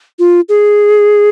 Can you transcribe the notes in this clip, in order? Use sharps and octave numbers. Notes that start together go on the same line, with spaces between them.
F4
G#4